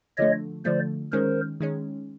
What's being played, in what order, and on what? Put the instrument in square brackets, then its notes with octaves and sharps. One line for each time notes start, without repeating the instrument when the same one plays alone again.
[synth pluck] D3 F3 A3 [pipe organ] C#5 D#5
[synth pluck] D3 F3 A3 [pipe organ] C5 D5
[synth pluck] D#3 G#3 C#4 [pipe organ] A#4 C5
[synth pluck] D#3 G#3 C#4